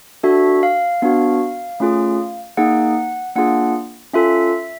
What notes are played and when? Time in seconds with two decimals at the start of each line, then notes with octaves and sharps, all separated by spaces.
0.23 D4 F#4 A4 E5
0.63 F5
1.02 B3 D4 F#4
1.80 A3 C#4 F4 G#4
2.57 A#3 D#4 G#4 F#5
3.36 A#3 D4 F4 G#4 F#5
4.13 C#4 F4 A4 E5